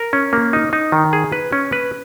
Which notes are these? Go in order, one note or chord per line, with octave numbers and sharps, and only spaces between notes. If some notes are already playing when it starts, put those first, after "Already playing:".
Already playing: A#4
C#4
A#3
D#4
D#4
D#3
G#4
B4
C#4
B4